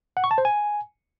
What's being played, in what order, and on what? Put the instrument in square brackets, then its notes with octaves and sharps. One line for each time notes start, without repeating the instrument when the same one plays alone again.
[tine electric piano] F#5
C#6
A5
C5
G#5